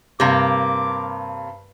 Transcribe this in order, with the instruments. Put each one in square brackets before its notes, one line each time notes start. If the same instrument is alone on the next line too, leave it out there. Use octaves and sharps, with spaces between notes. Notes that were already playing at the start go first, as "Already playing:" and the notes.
[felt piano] G2 [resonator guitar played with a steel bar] C3 A#3 [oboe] D6